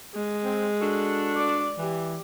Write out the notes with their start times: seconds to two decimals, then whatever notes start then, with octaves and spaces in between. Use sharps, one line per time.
0.14 G#3
0.44 C4
0.82 D4 F#4 A4
1.35 D5
1.79 E3 G4